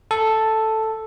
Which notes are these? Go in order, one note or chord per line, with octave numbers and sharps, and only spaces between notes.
A4